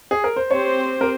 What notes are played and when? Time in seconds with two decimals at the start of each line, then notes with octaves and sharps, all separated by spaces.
0.11 G#4
0.24 A#4
0.36 C5
0.50 C4 G4 C5 C#5
1.01 A#4